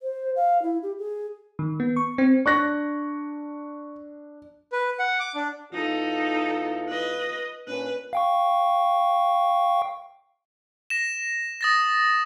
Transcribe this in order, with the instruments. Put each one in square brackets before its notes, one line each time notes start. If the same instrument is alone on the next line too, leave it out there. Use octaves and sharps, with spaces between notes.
[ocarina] C5
F5
E4
G4
G#4
[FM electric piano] D#3
B3
C#6
C4
[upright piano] D4 [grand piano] C#6 F#6 A#6
[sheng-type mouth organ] B4
F#5
D6
D4
[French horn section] E2 E3 F4 [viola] D#4 A4
[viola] B4 D#5
[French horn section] A#2 C#4 D4 [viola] B4
[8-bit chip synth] F5 G5 C#6
[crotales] A#6 E7
D#6 A6 A#6